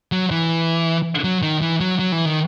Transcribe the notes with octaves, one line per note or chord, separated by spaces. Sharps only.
F#3
E3
F#3
D#3
E3
F#3
F#3
E3
D#3